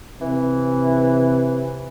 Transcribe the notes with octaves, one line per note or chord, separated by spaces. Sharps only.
C3 E3